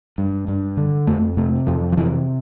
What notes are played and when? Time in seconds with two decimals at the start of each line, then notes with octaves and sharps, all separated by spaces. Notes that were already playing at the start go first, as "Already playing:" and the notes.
0.18 G2
0.48 G2
0.77 D3
1.07 F2 A3
1.37 C3 A3
1.67 F2 F3
1.92 F3
1.97 C3 E3